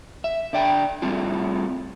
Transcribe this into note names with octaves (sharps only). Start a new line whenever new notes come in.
E5
D3 D5 G5
G3 A3 C4 F4